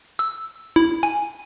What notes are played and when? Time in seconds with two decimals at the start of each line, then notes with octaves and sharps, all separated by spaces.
0.19 E6
0.76 E4
1.03 G#5